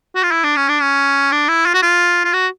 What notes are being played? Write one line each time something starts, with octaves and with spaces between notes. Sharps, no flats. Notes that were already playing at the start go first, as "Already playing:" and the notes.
F#4
F4
E4
D4
C#4
D4
C#4
D4
E4
F4
F#4
F4
F4
F#4